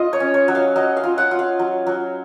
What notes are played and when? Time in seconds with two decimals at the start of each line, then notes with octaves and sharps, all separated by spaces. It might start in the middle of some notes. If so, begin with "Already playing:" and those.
Already playing: F4 D#5
0.13 C#5
0.20 C#4
0.34 C#5
0.48 F#3
0.55 F5
0.76 F#3 D#5
0.97 F5
1.03 F4
1.18 F#5
1.31 F4
1.39 F5
1.59 F#3
1.87 F#3